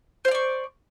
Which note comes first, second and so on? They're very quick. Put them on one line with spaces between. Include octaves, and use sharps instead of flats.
C5 F5 D5 C#6